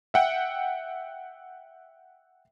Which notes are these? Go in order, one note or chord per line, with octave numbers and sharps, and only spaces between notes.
E5 F#5 G5